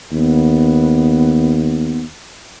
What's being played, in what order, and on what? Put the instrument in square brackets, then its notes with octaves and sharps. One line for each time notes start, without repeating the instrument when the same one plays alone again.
[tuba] D#2 [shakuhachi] B3